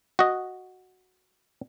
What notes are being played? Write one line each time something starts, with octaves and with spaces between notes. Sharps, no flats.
F#4 D#5